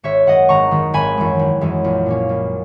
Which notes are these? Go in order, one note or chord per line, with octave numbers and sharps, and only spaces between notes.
G#1 C#5 E5
F#2 D#3 G#3 D#5 F#5
G#1 A#5 C#6
F#2 D#3 G#3
G#1 G#5 B5
F#2 E3 G#3
G#1
F#2 E3 G#3
A#1
A#2 A#3 C#4
A#1